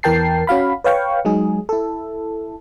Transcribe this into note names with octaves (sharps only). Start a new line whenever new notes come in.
E2 E3 A#4 G5 A5 C7
C#4 F#4 F5 B5
B4 C#5 F5 G5 C#6
F#3 G#3 D#4 G#4
E4 A4